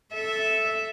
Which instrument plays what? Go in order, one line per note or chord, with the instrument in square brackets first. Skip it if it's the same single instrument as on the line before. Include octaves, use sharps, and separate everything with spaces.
[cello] A4 E5